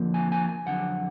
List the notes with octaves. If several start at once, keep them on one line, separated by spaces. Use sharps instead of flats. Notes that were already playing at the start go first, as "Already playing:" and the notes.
Already playing: F2 D3 F3 A#3
G#5
G#5
G#5
F2 D3 F#3 D4 F#5